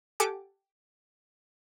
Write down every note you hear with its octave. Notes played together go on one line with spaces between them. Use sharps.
G4 A4 F#5 G#5 D6